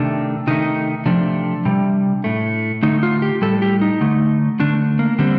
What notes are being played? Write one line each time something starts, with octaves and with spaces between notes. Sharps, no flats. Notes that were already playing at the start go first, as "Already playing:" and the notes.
Already playing: C3 D#3 A3 D4
C3 D#3 A3 D#4
C3 F3 A3 D4
C3 G3
A2 A3
D3 A3 D#4
F4
G4
A2 G3 A4
G4
D#4
D3 A3
D3 A3 D4
A#3
D3 G3 C4